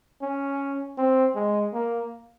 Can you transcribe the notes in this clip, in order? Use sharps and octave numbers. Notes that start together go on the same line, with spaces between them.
C#4
C4
G#3
A#3